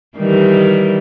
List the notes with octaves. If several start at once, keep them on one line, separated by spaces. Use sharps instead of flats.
D#3 E3 G3